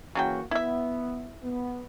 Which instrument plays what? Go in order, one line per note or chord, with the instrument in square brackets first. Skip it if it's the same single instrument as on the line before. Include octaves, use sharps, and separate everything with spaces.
[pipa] C#3 F#3 G5 [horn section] E3 A#3 F#4
[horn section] B3 [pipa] E4 E5
[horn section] B3